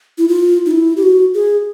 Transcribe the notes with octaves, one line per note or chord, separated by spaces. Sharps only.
E4
F4
D#4
E4
G4
F#4
G#4